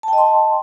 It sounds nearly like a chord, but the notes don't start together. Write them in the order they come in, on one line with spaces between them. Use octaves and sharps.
A5 G5 D#5 C6